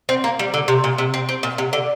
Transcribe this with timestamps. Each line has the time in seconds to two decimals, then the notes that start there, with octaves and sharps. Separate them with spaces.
0.09 C4
0.24 A#3
0.39 G3
0.54 D3
0.68 C3
0.84 A#2
0.98 C3
1.14 C4
1.29 C4
1.43 A#2
1.58 C3
1.73 D3